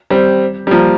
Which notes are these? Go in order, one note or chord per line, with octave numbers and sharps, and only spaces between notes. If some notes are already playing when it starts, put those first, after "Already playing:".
G3 C4
G3
F3 A#3